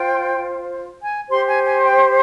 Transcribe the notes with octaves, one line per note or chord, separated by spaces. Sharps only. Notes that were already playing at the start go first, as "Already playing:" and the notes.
Already playing: F4 C5 G5
G#5
G4 C5 C6
G#5
G#5
G5